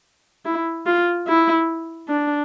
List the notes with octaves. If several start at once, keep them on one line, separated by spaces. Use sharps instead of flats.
E4
F4
E4
D4